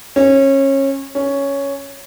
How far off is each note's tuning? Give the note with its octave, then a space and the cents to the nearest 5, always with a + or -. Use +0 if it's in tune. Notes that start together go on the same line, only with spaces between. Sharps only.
C#4 -25
C#4 +5